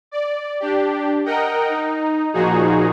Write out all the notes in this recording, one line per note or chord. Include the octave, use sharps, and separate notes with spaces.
D5
D4 G4
A#4 D#5 F#5 G5
D#4
A#2 F3 D#4 F#4 G#4